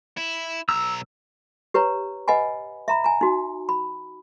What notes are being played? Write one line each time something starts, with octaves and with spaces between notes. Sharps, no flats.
E4
B1 A#5 E6
G4 B4 C#5 A#5
B4 D#5 F#5 G#5 B5
E5 A#5 B5
G#5 A#5
D#4 F#4
B5